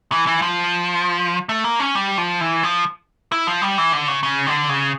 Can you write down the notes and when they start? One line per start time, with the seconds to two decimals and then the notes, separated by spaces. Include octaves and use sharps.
0.12 E3
0.27 E3
0.42 F3
1.49 A3
1.64 A#3
1.80 C#4
1.95 G3
2.18 F3
2.41 E3
2.63 F3
3.32 E4
3.47 F3
3.62 G3
3.78 E3
3.93 D3
4.08 C#3
4.23 C#3
4.47 D3
4.69 C#3